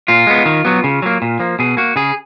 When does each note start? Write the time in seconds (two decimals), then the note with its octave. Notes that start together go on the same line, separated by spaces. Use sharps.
0.08 A#2 F4
0.27 G#3 B3
0.46 D#3
0.65 F#3 B3
0.84 C#3
1.02 F#3 A#3
1.22 A#2
1.40 F3 A#3
1.59 B2 G#4
1.77 A#3 F#4
1.96 C#3 G#4